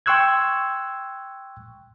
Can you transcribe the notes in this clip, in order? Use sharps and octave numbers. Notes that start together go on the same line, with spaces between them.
G5 C6 C#6 E6 F#6 G#6